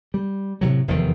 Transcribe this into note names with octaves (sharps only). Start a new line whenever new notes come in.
G3
A2 C3 D#3 F#3
F1 E2 D#3 F3